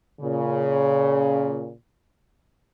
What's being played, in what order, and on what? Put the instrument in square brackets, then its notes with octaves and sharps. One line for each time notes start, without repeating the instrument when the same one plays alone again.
[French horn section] A#2 C#3